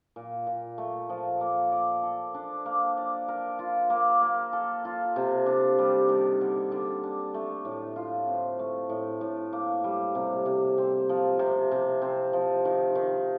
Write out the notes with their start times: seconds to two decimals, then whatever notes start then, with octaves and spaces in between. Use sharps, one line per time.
0.16 A#2
0.47 A#2
0.78 A3
1.09 F3
1.41 A#3
1.72 D5
2.03 A4
2.34 D4
2.66 A#3
2.97 D5
3.28 A#4
3.59 F4
3.90 A#3
4.22 A#3
4.53 A4
4.85 F4
5.16 C3
5.46 D4
5.79 G3
6.09 D#3
6.41 D3
6.72 D3
7.03 D4
7.34 A3
7.65 A2
7.96 F4
8.28 C4
8.59 A3
8.90 A2
9.21 A2
9.53 A#3
9.84 G3
10.15 C3
10.46 C3
10.78 C4
11.09 F3
11.39 C3
11.72 C3
12.02 C4
12.33 F3
12.65 D#3
12.95 D#3